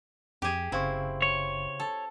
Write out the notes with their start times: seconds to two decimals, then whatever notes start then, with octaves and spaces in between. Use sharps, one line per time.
0.42 F2 G4 G#4
0.72 F#1 C#3 C4 E4 F5 C#6
1.22 C#5
1.80 A4